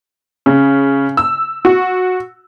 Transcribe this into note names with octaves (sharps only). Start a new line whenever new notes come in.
C#3
E6
F#4